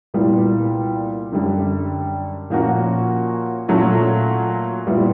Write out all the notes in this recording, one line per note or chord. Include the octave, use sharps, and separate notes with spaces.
C2 A#2 G3 B3
F#2 D3 G3
A#2 F3 A#3 C#4 F#4
A#2 F#3 A3 C#4
A#2 G3 B3 E4